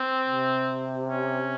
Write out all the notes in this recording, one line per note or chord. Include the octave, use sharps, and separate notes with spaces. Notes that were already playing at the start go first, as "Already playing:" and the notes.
Already playing: C4
C3
C#4